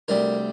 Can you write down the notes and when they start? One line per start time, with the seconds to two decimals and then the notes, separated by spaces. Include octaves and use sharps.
0.08 D2 C3 G3 A#4